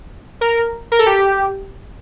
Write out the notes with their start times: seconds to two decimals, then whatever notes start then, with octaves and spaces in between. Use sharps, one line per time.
0.41 A#4
0.92 A#4
0.99 A4
1.06 G4